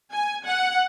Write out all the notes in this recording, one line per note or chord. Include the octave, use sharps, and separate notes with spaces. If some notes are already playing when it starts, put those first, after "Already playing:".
G#5
F#5